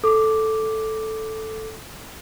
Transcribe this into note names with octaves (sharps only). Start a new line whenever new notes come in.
A4 D6